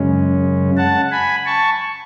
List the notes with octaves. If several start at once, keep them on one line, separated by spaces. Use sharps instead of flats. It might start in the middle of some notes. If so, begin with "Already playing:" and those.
Already playing: F#2 C#3 G#3 C#4
F#5 A5
G#5 B5
A5 C#6